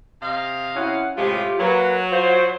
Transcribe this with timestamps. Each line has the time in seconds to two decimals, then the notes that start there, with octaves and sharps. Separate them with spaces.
0.22 C3 D#5 F5
0.76 C#4 E4 F#5
1.17 A2 C3 G#3 F4 G4
1.60 F#3 A#3 A#4 B4
2.12 F4 C5